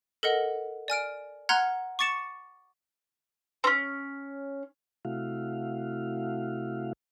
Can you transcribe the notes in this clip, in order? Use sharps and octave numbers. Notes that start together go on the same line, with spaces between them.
A4 A#4 D#5 F#5
D5 G#5 F6 D7
F#5 A#5 C6 F6 F#6 G#6
C#6 D6 A6 C#7 E7
C4 C#4
C3 A3 E4 F#4 F5